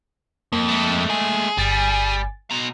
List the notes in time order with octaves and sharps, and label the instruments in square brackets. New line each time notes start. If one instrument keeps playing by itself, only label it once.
[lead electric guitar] F2 [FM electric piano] A#3
[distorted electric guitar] G#3 A3
[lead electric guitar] G#4
[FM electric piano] G1 G#5 A6 [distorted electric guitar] G3
[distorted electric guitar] B2 A#5